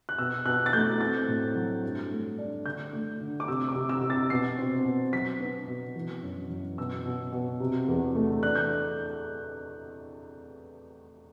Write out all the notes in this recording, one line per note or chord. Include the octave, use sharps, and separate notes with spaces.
F#6
B2 E6
B2 F#6
A6
A3 G6
C4 A6
A2
F#3
G2
A3
D4
D3 G6
A3
D3
D6
C3 E6
D6
C3
E6
C3
A6
B2 C7
C4
B2
F#3 B6
B3
B2
E3
F#2
F#2
B2 E6
B2
B2
C3
E2
A3
D4 F#6
G6